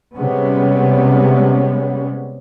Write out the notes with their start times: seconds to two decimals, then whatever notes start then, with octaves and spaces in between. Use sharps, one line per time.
0.14 C3 G3 G#3 B3 C#4